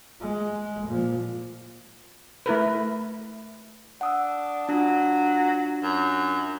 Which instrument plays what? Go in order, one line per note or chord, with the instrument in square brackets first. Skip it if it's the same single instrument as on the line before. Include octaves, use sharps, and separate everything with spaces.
[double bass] G#3
A#2 F3
[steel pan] A3 E4 A#4 B4
[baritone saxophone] D4 [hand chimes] F#5 D#6 E6
[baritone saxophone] F#3 [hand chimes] D4 F4
[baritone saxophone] F#2